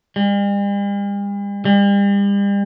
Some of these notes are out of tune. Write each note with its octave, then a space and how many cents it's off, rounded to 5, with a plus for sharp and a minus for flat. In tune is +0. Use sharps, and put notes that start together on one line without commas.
G3 +45
G3 +40